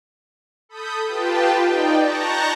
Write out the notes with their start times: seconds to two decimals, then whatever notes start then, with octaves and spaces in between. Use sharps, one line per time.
0.69 A4 B5 D#6 G6
1.08 F4 G4 B4 G5 A5
1.62 D#4 D5 G5
2.00 A5 A#5 C#6 F#6 G6 A#6